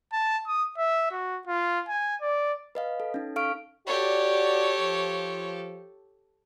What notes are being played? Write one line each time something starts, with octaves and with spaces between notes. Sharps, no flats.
A5
D#6
E5
F#4
F4
G#5
D5
B4 D#5 F5
A4
C#4 D#4
A4 F5 C#6 F6 D7
F#4 G4 A4 C#5 D5
F3